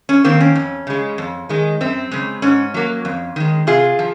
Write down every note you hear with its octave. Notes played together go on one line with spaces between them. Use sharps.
C#4
D#3 A#3 C4
C#4
F2
C#3 G#3
F2
D#3 G#3
F#2 C4
C#3 G#3
G#2 C#4
F#3 A#3
F2
D#3 G#3
C3 F4 G#4
F3